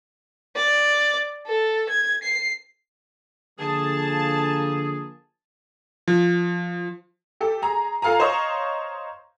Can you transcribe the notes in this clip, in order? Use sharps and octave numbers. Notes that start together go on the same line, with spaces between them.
D5
A4
G#6
C7
D3 F3 A#3 G#4 A5
F3
G4 A4
G#4 A#5
F4 A4 F5 G#5 A#5
C5 C#5 D#5 F5 A#5 C#6